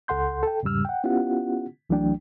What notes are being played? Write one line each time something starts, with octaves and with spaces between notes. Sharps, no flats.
C#2 A4 F#5 C6 G6
A4 G5
E2 G#2 C#3 G3 E6 F6
F#5 G5
B3 C#4 E4 F4 G4 F#5
C2 E3 F#3 A3 D4 G5